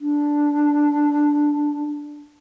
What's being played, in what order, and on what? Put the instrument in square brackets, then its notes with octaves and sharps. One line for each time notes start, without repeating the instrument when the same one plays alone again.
[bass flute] D4